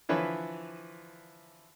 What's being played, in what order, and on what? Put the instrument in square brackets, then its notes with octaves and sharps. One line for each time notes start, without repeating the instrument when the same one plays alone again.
[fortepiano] D3 E3 F3 B4 C#5